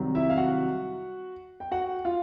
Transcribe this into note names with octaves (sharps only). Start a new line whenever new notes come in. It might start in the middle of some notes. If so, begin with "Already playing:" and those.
Already playing: C2 C3 D#3 F#3
E4 E5
F5
F#4 F#5
G5
F#4 F#5
F4 F5